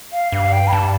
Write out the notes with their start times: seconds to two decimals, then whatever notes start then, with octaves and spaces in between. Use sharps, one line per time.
0.13 F5
0.32 G2 F5
0.53 G5
0.67 B5
0.72 G2 A5